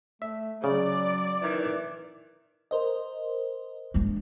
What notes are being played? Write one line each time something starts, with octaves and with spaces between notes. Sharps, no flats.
A3 E5
C#3 F#3 D5
D#3 E3
A#4 C5 D#5
G#3 D4